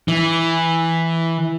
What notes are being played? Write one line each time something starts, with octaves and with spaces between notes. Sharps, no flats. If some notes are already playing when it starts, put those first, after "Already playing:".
E3